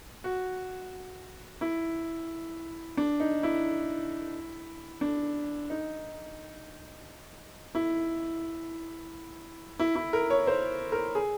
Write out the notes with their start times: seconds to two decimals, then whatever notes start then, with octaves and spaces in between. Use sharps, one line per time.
0.24 F#4
1.61 E4
2.97 D4
3.20 D#4
3.43 E4
5.01 D4
5.70 D#4
7.75 E4
9.79 E4
9.95 E4
10.13 A#4
10.30 C#5
10.47 C5
10.92 A#4
11.15 G#4